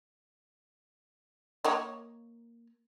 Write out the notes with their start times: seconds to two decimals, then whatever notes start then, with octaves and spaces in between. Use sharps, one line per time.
1.64 A#3 C#5 D#5